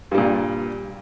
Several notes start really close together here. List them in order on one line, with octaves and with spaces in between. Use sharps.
G2 G3 A#2